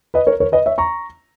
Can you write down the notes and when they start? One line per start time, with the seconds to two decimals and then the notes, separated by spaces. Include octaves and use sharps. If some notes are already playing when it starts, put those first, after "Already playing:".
0.14 B4 D#5
0.27 A#4 C#5
0.40 A#4 C#5
0.52 B4 D#5
0.66 C#5 E5
0.78 A#5 C#6